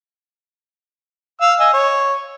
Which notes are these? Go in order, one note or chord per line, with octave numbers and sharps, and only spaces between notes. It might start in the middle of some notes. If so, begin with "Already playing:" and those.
F5 E6
D#5 G#5 E6
C#5